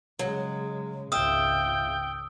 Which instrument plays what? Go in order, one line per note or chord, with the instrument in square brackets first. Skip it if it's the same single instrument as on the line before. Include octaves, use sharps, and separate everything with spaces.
[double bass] C#3 G#3 [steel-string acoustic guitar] F#3
[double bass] G#1 C#2 [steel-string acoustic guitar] F4 E5 [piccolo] G5 [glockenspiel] D#6 E6